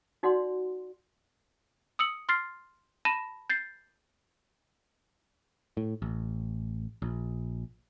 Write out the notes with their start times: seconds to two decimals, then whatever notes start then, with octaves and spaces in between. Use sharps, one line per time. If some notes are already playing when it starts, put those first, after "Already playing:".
0.23 D#4 F#4 D5 F#5 C6
1.99 D#6 E6 C#7 F#7
2.29 C6 F6 A6 C7
3.05 A5 B5 A#6 D#7 E7
3.50 G6 A6 C7
5.77 A2
6.02 A1
7.02 A#1